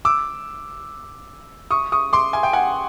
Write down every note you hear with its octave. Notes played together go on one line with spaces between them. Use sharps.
D6 E6
C#6 D#6
C#6 D#6
C6 D6
G#5
G5
F#5 G#5